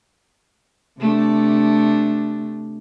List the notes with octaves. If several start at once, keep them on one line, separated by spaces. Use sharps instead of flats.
C3 A3 D4